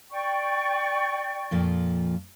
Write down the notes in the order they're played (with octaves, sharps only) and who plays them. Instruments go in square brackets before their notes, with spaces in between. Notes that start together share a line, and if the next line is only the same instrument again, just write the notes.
[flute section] D5 G5 C#6
[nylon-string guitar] F2 A#2 F3